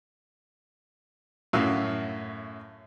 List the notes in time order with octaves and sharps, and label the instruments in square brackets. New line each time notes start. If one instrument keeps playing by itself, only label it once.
[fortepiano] F#2 A2 F#4 E5 F5